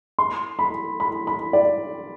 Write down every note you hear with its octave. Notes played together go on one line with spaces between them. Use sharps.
C6
B5
B5
B5
D5